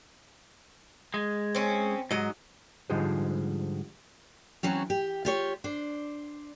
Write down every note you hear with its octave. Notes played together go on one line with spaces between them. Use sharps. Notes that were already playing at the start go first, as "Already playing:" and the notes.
G#3
C4 C#4
G#2 F#3 D#5
G#2 D3 F3 G3 G#3
E3 F#3 C4 C#4
G4
F4 G4 C#5
D4 C5